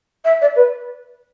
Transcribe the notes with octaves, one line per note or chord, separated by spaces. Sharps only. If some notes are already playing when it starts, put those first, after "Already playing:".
E5
D5
B4